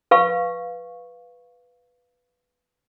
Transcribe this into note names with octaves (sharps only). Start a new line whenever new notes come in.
B4 F5 C#6